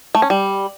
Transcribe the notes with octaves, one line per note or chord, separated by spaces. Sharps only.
A3
C#4
G3